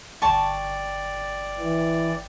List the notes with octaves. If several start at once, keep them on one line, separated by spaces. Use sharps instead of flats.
G1 D5 G5 A5 C#6
E3